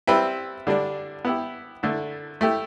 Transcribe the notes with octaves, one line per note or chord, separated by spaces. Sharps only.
G3 C4 E4 B4 E5
D3 G3 D4
B3 E4 G4
D3 A3 E4
A3 E4 G4